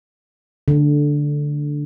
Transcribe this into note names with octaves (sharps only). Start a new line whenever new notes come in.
D3